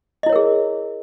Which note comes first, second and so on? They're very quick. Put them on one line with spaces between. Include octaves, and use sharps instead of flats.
D#5 E4 C#5 A#4 G#4